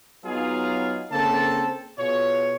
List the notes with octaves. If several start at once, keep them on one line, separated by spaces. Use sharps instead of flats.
F#3 B3 D#4 F4 G#4 F5
C#3 A#3 C4 A4 A5
B2 F4 G#4 C#5